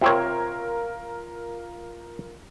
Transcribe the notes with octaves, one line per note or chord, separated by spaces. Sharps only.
C3 C4 F4 A#4 C#5